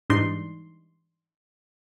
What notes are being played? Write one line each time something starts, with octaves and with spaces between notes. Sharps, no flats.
G#2 E3 G3 D4 D#4 C6